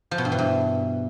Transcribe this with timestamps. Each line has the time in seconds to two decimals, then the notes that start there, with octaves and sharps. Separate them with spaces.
0.11 F3
0.18 B2
0.25 G2
0.32 E3
0.38 G2